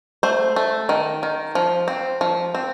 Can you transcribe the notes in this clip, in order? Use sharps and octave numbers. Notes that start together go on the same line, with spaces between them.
A3 C5
A3
D#3
D#3
F3
C4
F3
C4